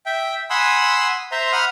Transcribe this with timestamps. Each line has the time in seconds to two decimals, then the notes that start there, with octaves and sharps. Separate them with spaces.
0.06 E5 G5
0.50 F#5 G#5 B5 C6 D#6 E6
1.32 C5 E5 A#5 C6
1.52 F#5 B5 D#6 F6